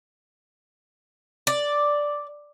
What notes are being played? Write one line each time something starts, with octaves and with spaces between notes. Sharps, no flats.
D5